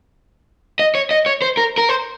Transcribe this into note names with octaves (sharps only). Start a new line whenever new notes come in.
D#5
C#5
D#5
C#5
C5
A#4
A#4
C5